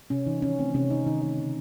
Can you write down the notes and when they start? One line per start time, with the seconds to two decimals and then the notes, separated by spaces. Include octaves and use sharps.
0.10 C3 C#4
0.27 E3 D#4
0.42 D#3 C#4
0.59 A3 C4
0.74 C3 C#4
0.90 D#3 D#4
1.06 D#3 D#4
1.22 A3 D#4
1.38 C#3